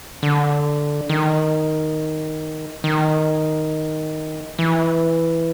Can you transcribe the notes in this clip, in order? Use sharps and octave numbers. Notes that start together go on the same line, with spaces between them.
D3
D#3
D#3
E3